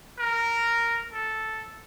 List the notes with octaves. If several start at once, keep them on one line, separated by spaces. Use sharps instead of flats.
A#4
A4